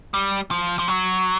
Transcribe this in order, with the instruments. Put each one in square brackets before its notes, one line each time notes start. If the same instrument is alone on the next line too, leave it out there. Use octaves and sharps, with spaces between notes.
[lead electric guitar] G3
F3
F3
F#3